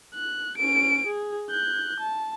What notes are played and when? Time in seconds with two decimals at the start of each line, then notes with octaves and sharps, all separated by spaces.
0.15 F#6
0.57 C#4 D7
1.07 G#4
1.50 F#6 G6
2.00 A5